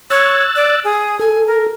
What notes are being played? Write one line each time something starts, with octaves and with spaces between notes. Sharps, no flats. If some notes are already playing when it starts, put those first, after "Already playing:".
C#5 E6 F#6 A6
D5
G#4
A4 G#5
A#4